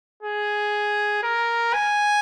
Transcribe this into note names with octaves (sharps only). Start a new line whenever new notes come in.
G#4
A#4
G#5